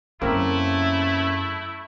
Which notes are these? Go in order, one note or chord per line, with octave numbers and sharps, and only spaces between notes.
F#2 C#3 A3 A#3 C4 E4 A#4